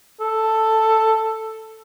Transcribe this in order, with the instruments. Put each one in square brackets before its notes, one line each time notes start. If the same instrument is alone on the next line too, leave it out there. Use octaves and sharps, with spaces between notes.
[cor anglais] A4